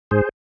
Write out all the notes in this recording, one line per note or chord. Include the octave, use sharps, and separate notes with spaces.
G#2 G#4 C5